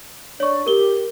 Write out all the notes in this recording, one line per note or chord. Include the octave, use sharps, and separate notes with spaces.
D4 C#5 D5 C#6
G4 A#4 G7